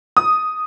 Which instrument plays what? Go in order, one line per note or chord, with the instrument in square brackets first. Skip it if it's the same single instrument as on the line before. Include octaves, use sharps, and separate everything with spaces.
[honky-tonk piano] D#6